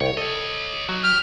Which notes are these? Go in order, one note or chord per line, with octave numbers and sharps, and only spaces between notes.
C2 C#5 G5
A4 C#5 D#5
F#3 D#4 F#4
G4 F6